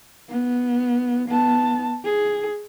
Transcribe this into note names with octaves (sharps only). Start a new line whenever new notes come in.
B3
B3 A5
G#4